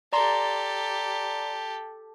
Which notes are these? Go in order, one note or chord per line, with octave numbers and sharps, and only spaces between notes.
G4 A4 D5 A#5 C6